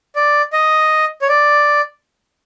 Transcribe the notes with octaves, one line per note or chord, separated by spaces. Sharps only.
D5
D#5
C#5
D5